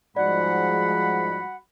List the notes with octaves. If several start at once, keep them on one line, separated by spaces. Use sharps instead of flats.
G#2 F3 G3 G#3 F#4 D5 F#5 B5